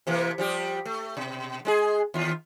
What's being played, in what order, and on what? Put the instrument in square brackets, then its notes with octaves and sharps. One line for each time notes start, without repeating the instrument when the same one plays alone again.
[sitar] C3 E3 A#3
F3 G3 G4
A3
B2
G#3 D4 G#4
D#2 F4